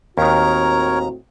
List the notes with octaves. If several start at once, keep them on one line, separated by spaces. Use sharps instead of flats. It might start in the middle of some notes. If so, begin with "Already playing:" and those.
D#2 A2 D#3 C4 F#4 A#4 C#5 A#5